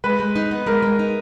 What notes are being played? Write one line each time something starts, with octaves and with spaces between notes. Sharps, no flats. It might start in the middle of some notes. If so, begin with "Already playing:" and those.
G#3 B4
G#3
D#4
B3
G#3 A#4
G#3
D#4